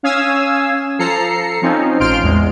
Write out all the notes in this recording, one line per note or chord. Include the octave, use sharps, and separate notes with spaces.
C#4 F5 G#5 D#6 E6
F3 A4 A#5 C7 C#7
F3 C4 C#4 D#4
A1 F4 C5 C6 F6 D7
E2 G#3